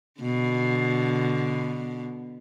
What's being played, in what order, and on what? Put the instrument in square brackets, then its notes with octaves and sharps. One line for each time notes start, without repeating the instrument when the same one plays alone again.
[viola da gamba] B2 D3